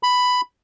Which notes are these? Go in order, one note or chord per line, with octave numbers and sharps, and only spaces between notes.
B5